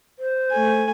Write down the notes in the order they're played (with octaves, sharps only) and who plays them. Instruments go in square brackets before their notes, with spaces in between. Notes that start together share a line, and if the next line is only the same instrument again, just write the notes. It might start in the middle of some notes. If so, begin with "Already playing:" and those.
[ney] C5
[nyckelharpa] A3 G#5